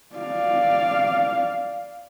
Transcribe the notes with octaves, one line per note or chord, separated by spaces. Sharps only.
D5 F5